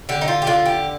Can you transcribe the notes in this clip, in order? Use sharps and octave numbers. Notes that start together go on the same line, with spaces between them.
D3 G4
D#4
F4
G4
D3 F4
G4